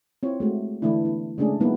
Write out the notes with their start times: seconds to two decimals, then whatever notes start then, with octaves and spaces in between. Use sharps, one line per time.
0.23 C4 E4 F4 C#5
0.40 G#3 A3 F#4
0.82 D3 E3 A3 D4 E4
1.05 B3 E4
1.38 C#3 G#3 A3 C#4 D4 G#4
1.60 F#3 A#3 B3 D#4 E4